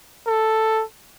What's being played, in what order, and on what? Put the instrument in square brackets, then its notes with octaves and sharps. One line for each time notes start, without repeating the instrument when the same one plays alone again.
[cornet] A4